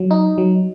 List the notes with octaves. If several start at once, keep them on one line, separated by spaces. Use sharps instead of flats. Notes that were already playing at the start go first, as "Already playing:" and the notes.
Already playing: F#3
D#4
F#3